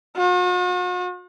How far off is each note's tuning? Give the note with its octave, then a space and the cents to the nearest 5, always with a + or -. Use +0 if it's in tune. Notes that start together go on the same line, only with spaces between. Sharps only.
F#4 -45